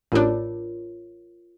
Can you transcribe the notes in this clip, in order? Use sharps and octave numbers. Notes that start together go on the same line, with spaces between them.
A1 D4 F4 A#4 C#5